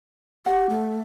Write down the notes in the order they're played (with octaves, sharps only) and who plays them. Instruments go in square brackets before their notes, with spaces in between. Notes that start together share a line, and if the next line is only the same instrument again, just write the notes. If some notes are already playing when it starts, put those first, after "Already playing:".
[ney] G4 [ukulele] F#5
[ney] A3